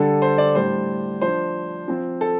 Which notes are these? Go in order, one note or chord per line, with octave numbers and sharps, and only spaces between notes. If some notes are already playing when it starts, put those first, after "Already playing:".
Already playing: D3 G3 D4 A4
C5
D5
A2 G3 D4 C5
F3 D4 C5
F3 C4
A4